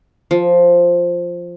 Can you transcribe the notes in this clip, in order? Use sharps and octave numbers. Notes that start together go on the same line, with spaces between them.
F3